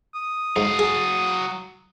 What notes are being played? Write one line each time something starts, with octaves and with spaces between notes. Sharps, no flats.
D#6
G#2 F#3 F5
G#4